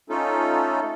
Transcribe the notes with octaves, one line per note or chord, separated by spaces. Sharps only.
A3 C#4 D#4 F4 A4